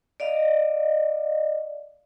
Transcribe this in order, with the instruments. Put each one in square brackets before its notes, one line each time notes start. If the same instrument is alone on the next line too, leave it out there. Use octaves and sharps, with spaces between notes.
[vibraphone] D5 D#5 F5